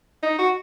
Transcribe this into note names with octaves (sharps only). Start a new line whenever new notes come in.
D#4
F#4